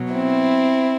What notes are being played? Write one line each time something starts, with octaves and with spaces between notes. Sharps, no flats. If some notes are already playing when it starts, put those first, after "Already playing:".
Already playing: B2 F#3
C4 E4